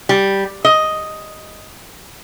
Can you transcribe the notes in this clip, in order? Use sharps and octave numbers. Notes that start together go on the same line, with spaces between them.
G3
D#5